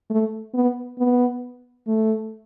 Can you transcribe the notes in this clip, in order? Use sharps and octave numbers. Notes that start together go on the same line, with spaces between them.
A3
B3
B3
A3